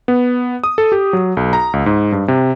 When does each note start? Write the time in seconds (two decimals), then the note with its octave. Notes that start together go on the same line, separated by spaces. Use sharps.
0.08 B3
0.64 D#6
0.78 A4
0.92 G4
1.13 F#3
1.37 B1
1.53 A#5
1.73 C#2
1.86 G#2
2.12 G2
2.28 C3